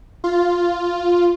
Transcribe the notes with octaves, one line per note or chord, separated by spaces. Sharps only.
F4